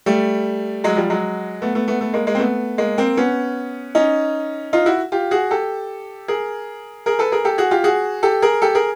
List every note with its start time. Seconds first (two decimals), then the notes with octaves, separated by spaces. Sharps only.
0.06 G3 A3
0.84 F#3 G#3
0.97 F3 G3
1.10 F#3 G#3
1.62 A3 B3
1.75 A3 B3
1.88 A3 B3
2.01 A3 B3
2.14 G#3 A#3
2.27 G#3 A#3
2.35 C4
2.39 A3 B3
2.78 G#3 A#3
2.98 A#3 C4
3.17 B3 C#4
3.95 C#4 D#4
4.73 D#4 F4
4.86 E4 F#4
5.12 F4 G4
5.31 F#4 G#4
5.51 G4 A4
6.28 G#4 A#4
7.06 G#4 A#4
7.19 A4 B4
7.32 G#4 A#4
7.45 G4 A4
7.58 F#4 G#4
7.71 F4 G4
7.84 F#4 G#4
8.23 G4 A4
8.42 G#4 A#4
8.62 G4 A4
8.75 G#4 A#4